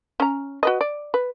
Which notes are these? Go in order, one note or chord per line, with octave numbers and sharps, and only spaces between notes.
C#4 A#5
F#4 B4 D#5
D5
B4